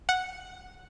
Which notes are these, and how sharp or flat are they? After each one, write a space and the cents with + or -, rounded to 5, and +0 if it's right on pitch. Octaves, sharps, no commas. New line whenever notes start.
F#5 -5